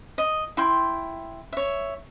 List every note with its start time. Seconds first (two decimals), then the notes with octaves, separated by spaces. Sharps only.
0.18 D#5
0.57 E4 G5 C6
1.53 C#5 E5